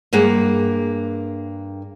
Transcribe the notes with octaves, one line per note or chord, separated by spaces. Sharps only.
G2 A#3 G#4 F#5